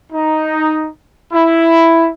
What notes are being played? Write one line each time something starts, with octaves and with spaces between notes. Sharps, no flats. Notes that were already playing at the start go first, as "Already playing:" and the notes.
D#4
E4